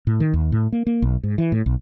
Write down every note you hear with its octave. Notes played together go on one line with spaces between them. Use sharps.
A2
D#3
D#2
A2
A#3
A#3
B1
G#2
E3
A2
B1